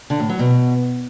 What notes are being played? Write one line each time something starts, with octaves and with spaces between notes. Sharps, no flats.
D3
A2
F#3
B2